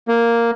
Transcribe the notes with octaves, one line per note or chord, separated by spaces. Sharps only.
A#3